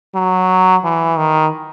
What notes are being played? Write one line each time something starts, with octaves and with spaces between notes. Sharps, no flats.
F#3
E3
D#3